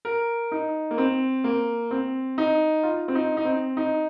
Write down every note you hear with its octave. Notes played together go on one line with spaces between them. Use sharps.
A#4
D#4
A#3
C4
A#3
C4
D#4
F4
C4
D#4
D#4
C4
D#4